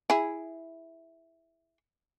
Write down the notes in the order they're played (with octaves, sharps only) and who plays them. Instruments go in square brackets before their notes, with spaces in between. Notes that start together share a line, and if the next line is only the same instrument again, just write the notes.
[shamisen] E4 G#4